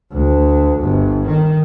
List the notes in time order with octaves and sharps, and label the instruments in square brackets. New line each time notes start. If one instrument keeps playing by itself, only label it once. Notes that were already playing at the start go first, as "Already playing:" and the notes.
[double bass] D2
G1
D#3